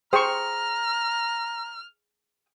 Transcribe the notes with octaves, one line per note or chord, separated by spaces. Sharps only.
G#4 C5 G5 A#5 C#6 F6